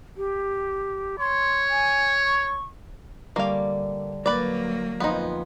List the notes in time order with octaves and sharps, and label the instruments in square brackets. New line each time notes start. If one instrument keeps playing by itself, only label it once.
[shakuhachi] G4
[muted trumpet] C#5 [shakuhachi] C6
[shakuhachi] G#5
C#6
[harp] D3 G3 C#6 [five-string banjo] A#3 F5
[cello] F#3 A#3 [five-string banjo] B4 D5
[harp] F2 F3 [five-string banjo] B3 D#4